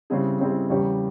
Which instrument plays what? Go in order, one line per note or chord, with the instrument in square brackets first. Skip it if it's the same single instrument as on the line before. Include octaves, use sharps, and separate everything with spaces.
[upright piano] C#3 G3 C4 E4 G#4
C#3 G3 C4 E4 G#4
E2 C#3 G3 C#4 G4